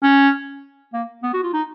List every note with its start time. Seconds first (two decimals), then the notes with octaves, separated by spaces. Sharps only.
0.02 C#4
0.93 A#3
1.23 B3
1.34 F#4
1.43 F4
1.53 D#4